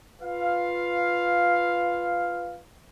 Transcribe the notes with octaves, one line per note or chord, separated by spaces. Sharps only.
F4 B4 F5